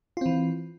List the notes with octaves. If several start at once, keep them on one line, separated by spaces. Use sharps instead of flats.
E3 C4 F4